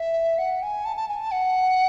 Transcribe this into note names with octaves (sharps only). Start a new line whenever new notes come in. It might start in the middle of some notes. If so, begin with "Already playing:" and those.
Already playing: E5
F#5
G#5
A5
A5
G#5
A5
F#5